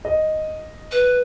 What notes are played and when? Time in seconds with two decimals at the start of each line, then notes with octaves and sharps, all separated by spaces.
0.05 D#5
0.91 B4